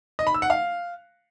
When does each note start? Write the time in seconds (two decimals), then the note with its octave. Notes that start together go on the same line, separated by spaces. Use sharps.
0.19 D#5
0.27 B5
0.34 E6
0.42 F#5
0.50 F5